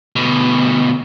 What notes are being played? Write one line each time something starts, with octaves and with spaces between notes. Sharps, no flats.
D2 B2